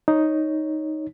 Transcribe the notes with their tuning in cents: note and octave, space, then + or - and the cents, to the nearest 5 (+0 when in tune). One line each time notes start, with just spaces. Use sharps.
D#4 +0 C#5 +0